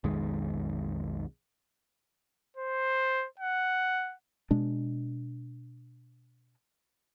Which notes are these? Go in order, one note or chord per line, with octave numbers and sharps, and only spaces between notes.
B1 F2 D#3 G#3
C5
F#5
B2 G#3 D4